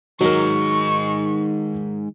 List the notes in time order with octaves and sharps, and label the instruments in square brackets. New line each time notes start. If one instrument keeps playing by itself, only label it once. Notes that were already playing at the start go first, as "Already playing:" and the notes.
[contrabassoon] D#3 [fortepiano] F#3 A#4 [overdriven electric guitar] G#3 D#4 [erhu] C#6